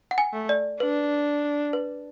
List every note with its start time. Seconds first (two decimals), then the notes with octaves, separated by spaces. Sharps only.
0.11 F#5
0.18 G#5
0.33 A3
0.49 D5
0.80 D4 B4
1.73 B4